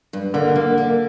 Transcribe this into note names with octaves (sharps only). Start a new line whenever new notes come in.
G2
D3 A#3
A#3
A#3